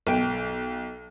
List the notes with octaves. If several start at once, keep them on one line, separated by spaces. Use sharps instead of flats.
B1 G5